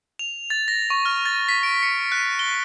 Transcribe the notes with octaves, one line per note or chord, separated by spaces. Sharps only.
F7
A6
A#6
C#6
F6
A6
B6
D7
C#7
F#6
G7